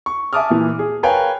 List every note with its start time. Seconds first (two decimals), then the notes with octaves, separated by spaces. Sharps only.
0.06 C#6
0.33 E5 G#5 A5 D6 D#6 F6
0.50 A#2 E3
0.79 G#4
1.03 A#4 B4 C#5 F5 G5 G#5